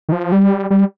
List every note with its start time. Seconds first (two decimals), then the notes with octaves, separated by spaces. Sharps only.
0.09 D#3
0.12 F3
0.32 G3
0.70 G3